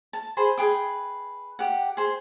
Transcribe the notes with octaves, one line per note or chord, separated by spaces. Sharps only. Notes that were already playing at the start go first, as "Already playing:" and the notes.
A5
G#4 C5 B5
G#4 B4 G5 D#6
G4 F#5
G#4 C5